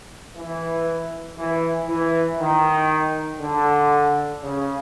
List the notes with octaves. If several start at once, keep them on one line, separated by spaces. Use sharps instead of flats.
E3
E3
E3
D#3
D3
C#3